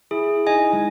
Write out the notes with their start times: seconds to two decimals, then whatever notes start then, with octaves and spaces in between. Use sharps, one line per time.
0.11 E4 G#4
0.47 D#4 D#5 G#5
0.72 G#3